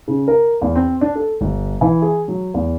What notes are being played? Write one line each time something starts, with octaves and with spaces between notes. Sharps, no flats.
C#3
A#4
E2
C4
D4
A4
G1
E3
G#4
F#3
E2